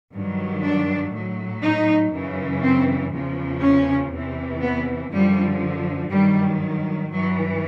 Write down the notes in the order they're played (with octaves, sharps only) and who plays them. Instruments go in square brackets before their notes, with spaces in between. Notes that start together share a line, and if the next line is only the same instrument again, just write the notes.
[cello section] G2 D#3 F#3
D4
A2 F#3
D#4
F#2 C#3 E3
C4
E2 C#3 F3
C#4
E2 C3 E3
B3
F#2 D3 F3 G3
G2 D#3 F#3 G3
G2 E3 F#3